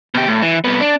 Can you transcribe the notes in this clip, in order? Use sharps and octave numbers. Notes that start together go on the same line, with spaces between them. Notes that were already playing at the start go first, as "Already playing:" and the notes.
B2 G4
A2
E3
C2 B3
D4